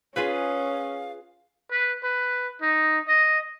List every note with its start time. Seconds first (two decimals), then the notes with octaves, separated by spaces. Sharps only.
0.16 C#4 F4 G#4 B4 F5
1.72 B4
2.04 B4
2.62 D#4
3.08 D#5